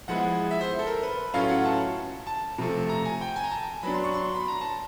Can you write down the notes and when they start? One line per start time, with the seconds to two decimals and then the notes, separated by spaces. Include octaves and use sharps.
0.08 F3 G#3 B3 E4 F#5
0.51 E5
0.61 C5
0.79 A4
0.87 A#4
1.03 B4
1.34 A2 F#3 A3 C#4 F4 F5
1.49 F#5
1.65 A5
2.27 A5
2.58 C3 F3 A3
2.89 A#5
3.05 G#5
3.21 G5
3.36 G#5
3.44 A#5
3.51 A5
3.83 F#3 B3 D4 B5
3.94 C6
4.04 C#6
4.14 C6
4.35 B5
4.48 A#5
4.61 A5